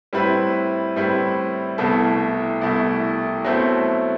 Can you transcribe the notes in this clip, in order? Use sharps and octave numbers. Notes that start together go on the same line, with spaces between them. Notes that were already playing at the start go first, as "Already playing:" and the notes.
A2 G3 C4 E4 B4
A2 G3 C4 E4 B4
C2 B2 A3 E4 A4
C2 B2 A3 E4 A4
B2 F#3 A3 C4 E4